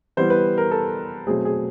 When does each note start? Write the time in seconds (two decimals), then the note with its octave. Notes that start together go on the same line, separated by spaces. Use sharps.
0.17 E3 G3 B3 C5
0.30 B4
0.58 A#4
0.71 A4
1.27 B2 F#3 A3 C4 G#4
1.45 G#4